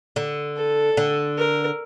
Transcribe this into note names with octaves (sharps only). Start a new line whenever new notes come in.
D3
A4
D3
A#4